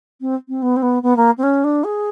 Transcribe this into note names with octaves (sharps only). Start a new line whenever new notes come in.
C4
C4
B3
C4
B3
B3
A#3
C4
C#4
D4
G#4